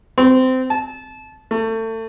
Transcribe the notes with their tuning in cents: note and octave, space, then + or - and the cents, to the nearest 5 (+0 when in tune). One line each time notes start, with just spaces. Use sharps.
C4 -20
A5 -25
A3 +30